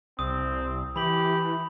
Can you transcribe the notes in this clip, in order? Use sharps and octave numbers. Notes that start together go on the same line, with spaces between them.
C2 C4 D#6
E3 G4 B5 F#7